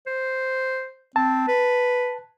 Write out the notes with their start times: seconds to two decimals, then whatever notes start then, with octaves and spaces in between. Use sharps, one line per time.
0.07 C5
1.16 C4 A5
1.48 B4